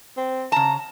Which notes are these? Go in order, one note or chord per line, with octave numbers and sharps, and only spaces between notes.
C4
C#3 A5 A#5